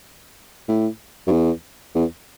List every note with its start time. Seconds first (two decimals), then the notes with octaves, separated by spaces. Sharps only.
0.68 A2
1.27 F#2
1.32 E2
1.95 E2